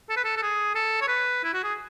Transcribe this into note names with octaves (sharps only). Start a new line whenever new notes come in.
A4
B4
A4
A4
G#4
A4
C#5
B4
E4
F#4
G#4